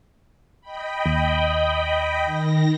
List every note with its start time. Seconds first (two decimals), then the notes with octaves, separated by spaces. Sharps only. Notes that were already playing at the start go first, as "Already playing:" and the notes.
0.61 D#5 G5 B5
1.06 D#2
2.25 D#3 A#6